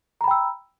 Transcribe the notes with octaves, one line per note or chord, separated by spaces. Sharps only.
G5 A#5 B5 E6